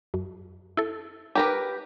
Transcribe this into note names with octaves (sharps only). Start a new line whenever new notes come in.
F#2
E4 A4
G4 A#4 B4 G#5